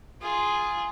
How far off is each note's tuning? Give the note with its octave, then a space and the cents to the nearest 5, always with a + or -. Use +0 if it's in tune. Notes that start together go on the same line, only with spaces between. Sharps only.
F4 -5 G#4 +0